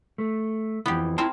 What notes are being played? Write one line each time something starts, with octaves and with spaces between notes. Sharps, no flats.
A3
F2 E3 B3 G4
C4 E4 A#4 C5 A5